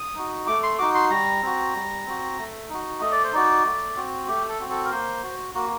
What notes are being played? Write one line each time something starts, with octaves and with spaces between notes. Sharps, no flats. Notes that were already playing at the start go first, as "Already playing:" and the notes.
Already playing: D#6
D#4 F#4
A3 D6
C6
D#4 F#4 D6
C6
G3 A#5
C4 F#4
G3
C4 F#4
A3
D#4 F#4
A3 D#5
D5
C5
D#4 F#4 D5
A3
C4 F#4
A3 G4
A4
C4 F#4
A4
A#4
A#3 C5
F#4
A#3 F#4